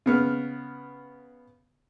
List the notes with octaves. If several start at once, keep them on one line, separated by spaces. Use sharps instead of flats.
C#3 B3 F6